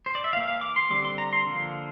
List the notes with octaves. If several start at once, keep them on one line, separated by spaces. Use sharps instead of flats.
C5
D5
E5
E3 A#3 F5
F5
D6
C6
D3 G3 C4 D6
C6
A#5
C6
D3 F3 A#3